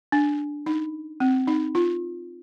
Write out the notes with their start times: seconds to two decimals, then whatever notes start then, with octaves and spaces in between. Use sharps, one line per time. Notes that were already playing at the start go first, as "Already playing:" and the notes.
0.12 D4
0.66 D#4
1.20 C4
1.47 D#4
1.75 F4